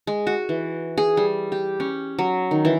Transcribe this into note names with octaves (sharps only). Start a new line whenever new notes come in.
G#3
F#4
E3
G#4
G3
G4
C#4
F#3
D#3
E3